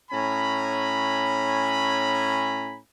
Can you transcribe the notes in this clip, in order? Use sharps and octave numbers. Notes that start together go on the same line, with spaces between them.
A2 C#4 G#5 A#5 B5